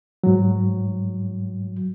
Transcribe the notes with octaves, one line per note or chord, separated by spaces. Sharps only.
G#2 F#3